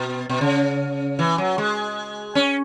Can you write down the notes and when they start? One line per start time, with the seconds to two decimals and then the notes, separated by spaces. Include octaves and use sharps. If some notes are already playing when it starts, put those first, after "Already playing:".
Already playing: B2
0.29 B2
0.41 C#3
1.19 E3
1.38 F#3
1.58 G#3
2.35 C#4